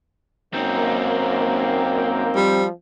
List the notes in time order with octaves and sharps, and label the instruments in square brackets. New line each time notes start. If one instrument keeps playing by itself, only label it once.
[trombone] F#2 [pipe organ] A#3 [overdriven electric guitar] C4 D#4
[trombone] F3 [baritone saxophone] G3